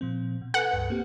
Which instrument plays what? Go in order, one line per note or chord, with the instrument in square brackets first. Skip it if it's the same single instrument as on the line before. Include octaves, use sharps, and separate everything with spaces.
[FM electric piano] A#2 F3 C4
B2
[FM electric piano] A4 B4 G#5 [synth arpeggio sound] F#5
[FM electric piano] C#2 G2 B4
A#3 C4 G4